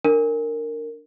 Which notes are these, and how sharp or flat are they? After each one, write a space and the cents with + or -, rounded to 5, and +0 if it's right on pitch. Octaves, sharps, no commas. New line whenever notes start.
D4 +10 A#4 -15